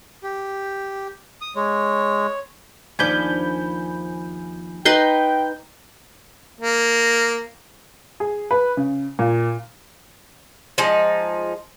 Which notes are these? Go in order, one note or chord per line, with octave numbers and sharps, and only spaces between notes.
G4
D#6
G#3 C#5
D#2 F3 D4 G#5 B5 G6
D#4 B4 G5 C6 G6
A#3
G#4
B4
C#3
A#2
F3 G#3 D#4